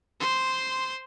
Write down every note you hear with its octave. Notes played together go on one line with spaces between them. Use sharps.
C5 C6